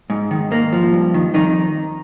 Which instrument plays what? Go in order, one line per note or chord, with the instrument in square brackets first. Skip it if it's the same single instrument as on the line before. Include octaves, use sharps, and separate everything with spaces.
[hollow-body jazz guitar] G#2
D#3
G#2 A#3
F3
G2
D#3
F2 D#3 D#4